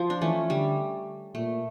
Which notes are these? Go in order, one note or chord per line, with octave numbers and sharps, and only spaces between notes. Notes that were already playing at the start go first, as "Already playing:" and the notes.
Already playing: F3
D4
E3 A3 C#4
D3 G3
A#2 A3